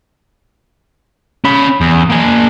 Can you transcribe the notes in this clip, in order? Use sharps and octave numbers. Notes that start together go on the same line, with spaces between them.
C#4 B5
E2
A#3 G#4